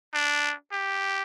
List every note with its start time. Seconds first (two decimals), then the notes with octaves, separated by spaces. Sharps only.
0.14 D4
0.72 G4